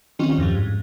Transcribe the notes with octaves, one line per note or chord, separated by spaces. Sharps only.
D#3 G3 C4 C#4 F4
E2 G2 F3
G#2